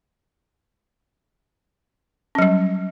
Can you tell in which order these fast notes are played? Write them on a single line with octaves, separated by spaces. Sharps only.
C#4 F#3 G3